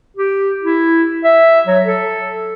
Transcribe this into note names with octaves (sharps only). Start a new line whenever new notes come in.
G4
E4
E5
F#3
A4